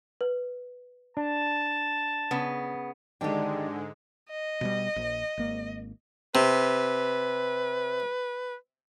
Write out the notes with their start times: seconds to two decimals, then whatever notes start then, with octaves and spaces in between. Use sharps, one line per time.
0.21 B4
1.17 D4 A5
2.31 C#3 B3
3.21 G#2 D3 D#3 G#3 D4 G4 G5
4.30 D#5
4.61 B2 F#3 G3
4.96 A#1
5.37 G#1 A#3
6.35 C3 B4